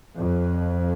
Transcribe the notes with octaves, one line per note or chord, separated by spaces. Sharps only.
F2